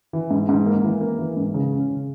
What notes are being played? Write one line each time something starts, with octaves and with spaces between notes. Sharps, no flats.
E3
G#2
G#2
A#3
E3
A#3
E3
G#2
C#3
C#4
C#3